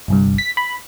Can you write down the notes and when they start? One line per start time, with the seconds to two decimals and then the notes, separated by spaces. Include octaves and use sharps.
0.08 G1 C2 G2
0.38 B6
0.57 B5